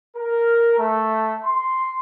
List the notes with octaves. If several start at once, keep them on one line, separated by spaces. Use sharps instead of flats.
A#4
A3
C6